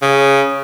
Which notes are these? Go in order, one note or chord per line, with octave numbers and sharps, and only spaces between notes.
C#3